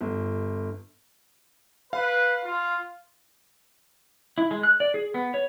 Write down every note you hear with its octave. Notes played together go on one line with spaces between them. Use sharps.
G1
B4 F5
F4
E4
G#3
F#6
D5
G#4
B3
C#5